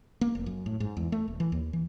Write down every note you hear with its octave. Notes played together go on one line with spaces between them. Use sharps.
A#3
F1
F#2
A2
G#2
E2
A3
D#1
E3
D#2
E3